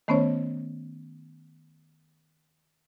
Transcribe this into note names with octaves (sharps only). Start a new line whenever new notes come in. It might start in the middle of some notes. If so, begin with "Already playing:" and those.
D#3 A3 B3 C#4 C5 C#5